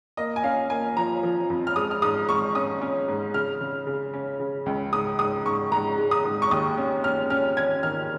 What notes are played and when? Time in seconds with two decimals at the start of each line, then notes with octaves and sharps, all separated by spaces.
0.17 A#3 D#5
0.36 G#5
0.43 C#4 F5
0.70 A#3 G#5
0.96 F3 A#5
1.23 F3
1.50 F2
1.67 F6
1.76 G#3 D#6
1.91 F6
2.02 G#2 D#6
2.28 G#2 C#6
2.55 C#4 D#6
2.81 C#4
3.08 G#2
3.34 C#3 F6
3.61 C#3
3.87 C#3
4.13 C#4
4.40 C#3
4.66 C#2
4.92 G#2 D#6
5.19 G#2 D#6
5.46 G#2 C#6
5.72 G#2 A#5
5.98 G#3
6.11 D#6
6.25 G#2
6.42 C#6
6.51 D#2 D#6
6.77 C#4
7.04 C#4 F6
7.30 C#4 F6
7.57 C#4 G#6
7.83 D#3 F6